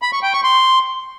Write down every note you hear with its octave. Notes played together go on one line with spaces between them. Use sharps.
B5
C#6
G5
C#6
C6